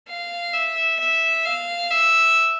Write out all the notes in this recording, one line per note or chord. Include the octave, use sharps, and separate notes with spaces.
F5
E5
E5
F5
E5